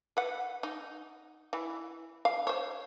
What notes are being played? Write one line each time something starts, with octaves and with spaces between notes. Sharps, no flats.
B4 F#5
D#4
E3
F5
C5 C#5